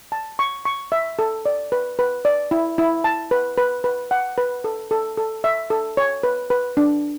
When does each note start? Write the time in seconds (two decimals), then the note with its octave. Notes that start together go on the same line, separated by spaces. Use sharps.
0.12 A5
0.39 C#6
0.65 C#6
0.92 E5
1.19 A4
1.46 D5
1.72 B4
1.99 B4
2.25 D5
2.51 E4
2.78 E4
3.04 A5
3.31 B4
3.58 B4
3.84 B4
4.11 F#5
4.38 B4
4.64 A4
4.91 A4
5.17 A4
5.44 E5
5.70 A4
5.97 C#5
6.23 B4
6.50 B4
6.77 D4